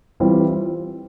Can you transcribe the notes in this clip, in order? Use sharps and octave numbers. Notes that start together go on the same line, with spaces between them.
E3 G3 C4 F4